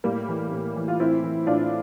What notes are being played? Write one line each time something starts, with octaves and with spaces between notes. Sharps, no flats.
A2 G3 A#3
E3
A2
E3
F4
A2 C4 E4
E3
A2 D4 F4